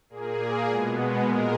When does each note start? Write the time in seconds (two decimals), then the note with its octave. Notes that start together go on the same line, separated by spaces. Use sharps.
0.10 A#2 A#3 G#4
0.68 B2 G#3 B3
1.25 A#2 G#3 A#4